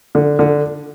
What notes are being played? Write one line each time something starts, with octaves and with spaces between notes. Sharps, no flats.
D3
D3